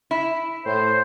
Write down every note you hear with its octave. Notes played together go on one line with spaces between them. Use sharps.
E4
A2 C5